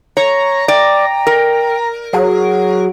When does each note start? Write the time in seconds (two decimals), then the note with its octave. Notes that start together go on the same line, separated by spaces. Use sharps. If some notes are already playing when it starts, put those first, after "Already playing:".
0.17 C#5 A#5
0.68 D5 G5
1.27 A#4
2.13 F#3 G#4